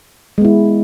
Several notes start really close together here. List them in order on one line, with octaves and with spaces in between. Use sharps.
G#3 B3 E4